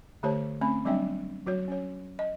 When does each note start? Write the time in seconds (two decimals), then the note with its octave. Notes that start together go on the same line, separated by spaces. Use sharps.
0.23 D3 A3 G4 C5 C#5 A5
0.61 A3 C4 C#4 B5
0.85 F#3 G3 C4 D4 E5 G5
1.46 F#3 F#4 C#5
1.68 C#4 C#5
2.19 D#5